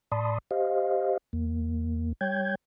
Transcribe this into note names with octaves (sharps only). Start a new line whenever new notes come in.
A2 D5 A5 B5 C6 D#6
G4 C5 D#5 F5
E2 A#3
G3 C#5 G5 G6 G#6